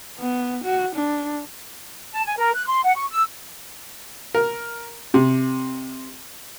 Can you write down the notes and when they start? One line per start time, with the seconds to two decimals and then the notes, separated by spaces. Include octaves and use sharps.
0.19 B3
0.64 F#4
0.95 D4
2.13 A5
2.26 G#5
2.39 A#4
2.55 F#6
2.68 C6
2.85 F#5
2.97 C#6
3.12 E6
4.35 A#4
5.14 C3